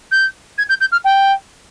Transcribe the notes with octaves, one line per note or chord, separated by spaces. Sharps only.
G6
G#6
G6
G6
F6
G5